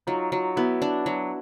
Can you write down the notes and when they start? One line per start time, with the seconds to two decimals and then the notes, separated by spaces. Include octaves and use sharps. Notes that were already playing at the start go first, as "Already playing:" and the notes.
0.07 F#3 D#4 F4
0.32 F#3
0.56 B3 E4 F#4
0.82 D4
1.06 F#3